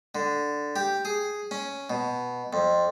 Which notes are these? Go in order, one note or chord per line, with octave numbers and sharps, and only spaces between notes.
D3
G4
G#4
C#4
B2
F2